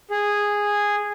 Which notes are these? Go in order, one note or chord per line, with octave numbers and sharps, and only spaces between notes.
G#4